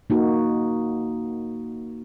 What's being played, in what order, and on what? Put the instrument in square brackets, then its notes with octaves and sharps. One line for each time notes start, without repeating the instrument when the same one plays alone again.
[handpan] A#3 D#4 F#4